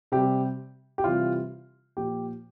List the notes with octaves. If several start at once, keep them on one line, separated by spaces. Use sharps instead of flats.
C3 G3 G4
G4
C3 E3 G3 F4
A#2 F3 G4